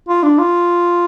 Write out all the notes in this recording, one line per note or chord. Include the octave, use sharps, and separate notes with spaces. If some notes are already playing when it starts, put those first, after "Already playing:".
F4
D4
F4